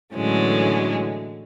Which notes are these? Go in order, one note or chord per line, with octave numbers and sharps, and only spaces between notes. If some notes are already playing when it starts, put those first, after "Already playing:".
A2 D3 E3 F#3 G#3 C#4